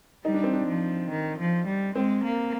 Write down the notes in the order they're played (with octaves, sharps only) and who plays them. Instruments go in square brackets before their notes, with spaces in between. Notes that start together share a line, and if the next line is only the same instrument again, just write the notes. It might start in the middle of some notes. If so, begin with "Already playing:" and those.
[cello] G3 [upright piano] D#4
[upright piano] D4
C4
D4
[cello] F3
D#3
F3
G3
[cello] G#3 [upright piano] C4
[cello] A#3